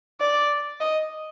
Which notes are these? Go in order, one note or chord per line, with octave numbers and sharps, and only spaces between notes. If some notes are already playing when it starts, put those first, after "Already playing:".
D5
D#5